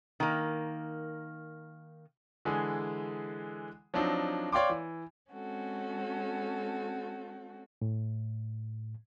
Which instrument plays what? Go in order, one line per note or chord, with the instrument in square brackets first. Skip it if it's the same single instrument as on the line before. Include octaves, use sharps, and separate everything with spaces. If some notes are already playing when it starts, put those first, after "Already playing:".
[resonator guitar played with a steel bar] D#3 A#3
[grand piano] D3 E3 G#3 G#4
F3 F#3 C4 D4 D#4
C#5 D5 F5 G5 C6 D6
E3
[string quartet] G#3 C4 C#4 F#4 A4
[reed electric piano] A2